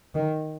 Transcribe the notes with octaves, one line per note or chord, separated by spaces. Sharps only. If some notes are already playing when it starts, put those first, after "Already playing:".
D#3